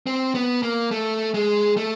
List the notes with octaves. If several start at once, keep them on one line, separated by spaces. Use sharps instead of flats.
C4
B3
A#3
A3
G#3
A3